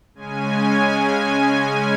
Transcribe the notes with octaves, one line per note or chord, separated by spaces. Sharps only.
C#3 G#3 C#4 G#5